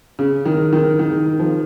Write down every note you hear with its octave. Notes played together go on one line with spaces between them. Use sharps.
C#3
D#3
D#3
D#3
F3